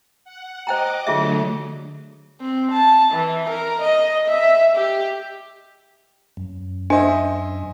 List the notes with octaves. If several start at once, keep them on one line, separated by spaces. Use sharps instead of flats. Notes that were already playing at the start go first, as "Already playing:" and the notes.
F#5
C5 D#5 G5 A#5 D6
D3 F#3 A3 F4 G#4 E5
C4
A5
E3
A#4
D#5
E5
G4
F#2
D4 C5 D#5 E5 G#5